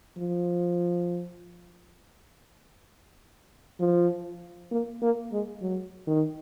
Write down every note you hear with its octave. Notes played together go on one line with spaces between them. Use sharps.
F3
F3
A#3
A#3
G#3
F#3
D#3